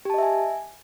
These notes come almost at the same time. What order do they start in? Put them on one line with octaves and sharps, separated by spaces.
G4 A5 D#5 E5 G#5